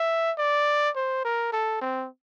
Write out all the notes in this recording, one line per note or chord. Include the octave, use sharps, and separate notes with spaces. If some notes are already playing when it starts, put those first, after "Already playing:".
Already playing: E5
D5
C5
A#4
A4
C4